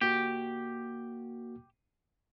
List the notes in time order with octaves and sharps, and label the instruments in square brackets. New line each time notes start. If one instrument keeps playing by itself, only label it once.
[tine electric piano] A#3 F#4 [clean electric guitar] G4